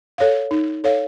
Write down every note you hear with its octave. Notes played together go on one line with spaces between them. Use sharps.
A4 C#5 F5
D#4
A4 C#5 F5